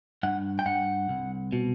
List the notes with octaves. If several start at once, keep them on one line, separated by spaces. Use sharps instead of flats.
G2 F#5
G5
G2 F#5
C2
B2